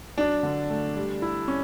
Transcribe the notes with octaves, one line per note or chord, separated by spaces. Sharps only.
F#3 D4
D3
A3
G3
E4
C#4